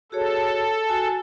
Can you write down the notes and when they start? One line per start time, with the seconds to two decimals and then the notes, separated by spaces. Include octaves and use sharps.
0.12 F#4 G#4 A4 C#5
0.88 F#4 G#5 A5